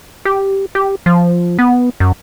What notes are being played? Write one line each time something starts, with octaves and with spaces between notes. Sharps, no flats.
G4
G4
F3
B3
F#2